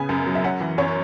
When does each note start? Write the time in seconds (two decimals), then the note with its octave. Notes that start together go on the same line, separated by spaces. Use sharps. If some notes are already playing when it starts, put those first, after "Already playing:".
Already playing: C#3 B3 G#5
0.09 F#2
0.26 F#3
0.35 E5
0.44 C#4 F#5
0.60 E3
0.78 F#2 C#5